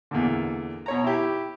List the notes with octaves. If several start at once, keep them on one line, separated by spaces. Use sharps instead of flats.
E2 A#2 D3
B2 C#5 A#5
E4 G4